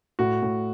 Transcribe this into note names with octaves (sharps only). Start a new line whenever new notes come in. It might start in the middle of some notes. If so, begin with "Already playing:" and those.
A2 F#4
A2